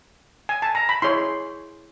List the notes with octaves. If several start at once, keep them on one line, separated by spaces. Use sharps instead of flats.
G#5
A5
A#5
B5
E4 G#4 C#5 C6